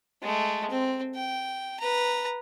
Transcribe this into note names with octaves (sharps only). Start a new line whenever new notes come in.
G#3 A3
C4
G5
B4 A#5